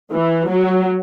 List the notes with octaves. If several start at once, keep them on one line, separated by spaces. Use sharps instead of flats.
E3
F#3